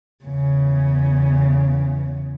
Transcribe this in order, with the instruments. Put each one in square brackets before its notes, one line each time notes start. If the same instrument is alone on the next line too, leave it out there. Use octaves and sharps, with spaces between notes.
[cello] E2 C#3